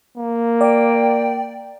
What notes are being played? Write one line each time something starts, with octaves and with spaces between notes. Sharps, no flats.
A#3
D5 G5